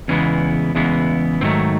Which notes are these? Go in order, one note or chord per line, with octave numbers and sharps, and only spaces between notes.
E2 C#3 E3 G#3 B3 C#4
E2 C#3 E3 G#3 B3
G#2 D#3 F#3 A3 C4